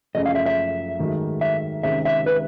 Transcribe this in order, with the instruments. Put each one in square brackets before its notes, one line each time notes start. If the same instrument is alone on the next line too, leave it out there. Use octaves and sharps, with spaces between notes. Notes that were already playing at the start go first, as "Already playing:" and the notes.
[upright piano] F#1 F#2 C#3 F3 A3 [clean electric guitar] D#5
[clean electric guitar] F5
E5
E5
[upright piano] G#2 D#3 F#3 A3
[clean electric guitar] E5
[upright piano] C#2 C3 D#3 G#3 C4 [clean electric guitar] E5
[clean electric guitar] E5
B4